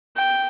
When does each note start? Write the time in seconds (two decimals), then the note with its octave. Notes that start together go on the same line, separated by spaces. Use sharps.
0.16 G5